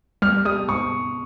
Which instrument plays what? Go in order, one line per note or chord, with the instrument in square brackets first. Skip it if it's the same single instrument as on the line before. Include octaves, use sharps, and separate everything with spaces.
[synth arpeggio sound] G3 [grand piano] F6
[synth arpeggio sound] G3 [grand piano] D#6
[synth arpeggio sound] G#2 [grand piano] C#6